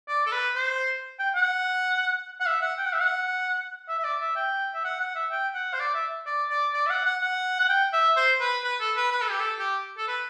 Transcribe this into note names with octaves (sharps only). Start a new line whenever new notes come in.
D5
A4
B4
C5
G5
F#5
F#5
E5
F#5
G5
F#5
E5
F#5
E5
E5
D5
E5
G5
E5
F#5
F#5
E5
G5
F#5
C5
D5
E5
D5
D5
D5
E5
F#5
F#5
F#5
F#5
G5
E5
C5
B4
B4
A4
B4
B4
A4
G4
A4
G4
A4
B4